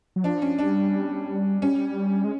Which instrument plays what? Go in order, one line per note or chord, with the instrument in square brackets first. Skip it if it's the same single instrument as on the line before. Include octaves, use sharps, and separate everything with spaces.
[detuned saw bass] F#3
[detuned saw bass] F3 [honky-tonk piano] D4
[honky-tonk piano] C#4
[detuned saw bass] G3 [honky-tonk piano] D4
[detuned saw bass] G3 [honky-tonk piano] C#4
[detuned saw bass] G#3